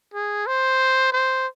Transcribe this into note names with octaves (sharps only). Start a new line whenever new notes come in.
G#4
C5
C5